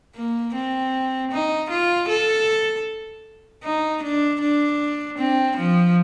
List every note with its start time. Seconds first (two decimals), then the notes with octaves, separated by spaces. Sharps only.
0.16 A#3
0.55 C4
1.32 D#4
1.70 F4
2.09 A4
3.64 D#4
4.03 D4
4.41 D4
5.18 C4
5.57 F3